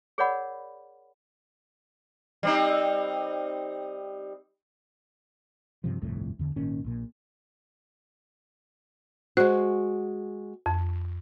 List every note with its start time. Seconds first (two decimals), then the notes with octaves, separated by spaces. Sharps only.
0.18 G#4 A#4 C#5 D5 F#5 B5
2.43 G3 C4 D#4
5.84 G2 C3 F3
6.01 G1 C2 F2 A2
6.39 E2 D3
6.56 G#1 A#2 D#3 C#4
6.84 A#1 A#2
9.37 G#3 F#4 C5 F#6
10.66 F2